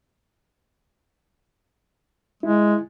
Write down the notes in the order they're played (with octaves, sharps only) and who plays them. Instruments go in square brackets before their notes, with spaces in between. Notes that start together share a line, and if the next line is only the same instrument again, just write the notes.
[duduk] G#3 [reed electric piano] E4